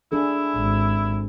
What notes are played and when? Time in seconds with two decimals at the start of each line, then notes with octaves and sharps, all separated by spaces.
0.12 D4 E4 G#4 A4
0.56 G#1